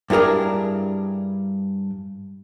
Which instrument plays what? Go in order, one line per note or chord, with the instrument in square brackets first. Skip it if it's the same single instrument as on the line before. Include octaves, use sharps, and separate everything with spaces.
[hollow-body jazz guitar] G2 E4 G#4 A#4 D5